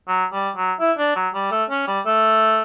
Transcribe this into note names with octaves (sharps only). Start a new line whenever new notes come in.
F#3
G3
F#3
E4
D4
F#3
G3
A3
C#4
G3
A3